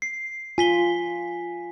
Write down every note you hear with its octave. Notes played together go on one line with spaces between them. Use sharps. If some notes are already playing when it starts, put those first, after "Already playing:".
C7
F4 G#5 B6 G7